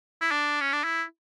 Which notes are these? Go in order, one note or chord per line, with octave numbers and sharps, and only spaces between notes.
E4
D4
C#4
D4
E4